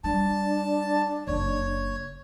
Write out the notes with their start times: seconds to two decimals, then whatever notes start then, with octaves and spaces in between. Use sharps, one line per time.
0.04 G3 D4 A5
1.27 F#1 C#5